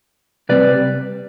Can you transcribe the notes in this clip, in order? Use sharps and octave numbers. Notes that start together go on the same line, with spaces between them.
C3 G3 C4 B4 D5